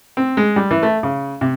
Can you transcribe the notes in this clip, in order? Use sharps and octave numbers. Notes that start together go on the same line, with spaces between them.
C4
G#3
G3
E3
A3
C#3
C3